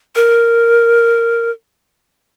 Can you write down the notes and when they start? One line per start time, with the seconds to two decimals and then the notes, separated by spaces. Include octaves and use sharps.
0.15 A#4